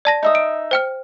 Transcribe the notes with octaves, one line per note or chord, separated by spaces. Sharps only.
D5 A5 A#6
D#4 E5 D#6
D7
C5 G5 F6